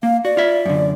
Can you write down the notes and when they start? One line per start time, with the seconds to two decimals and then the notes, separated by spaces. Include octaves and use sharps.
0.03 A#3 F5
0.25 F#4 D5
0.37 F4 E5
0.66 F#2 D3